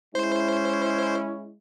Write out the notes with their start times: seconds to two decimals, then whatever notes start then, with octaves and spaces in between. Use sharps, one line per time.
0.15 G#3 C#4 E4 C5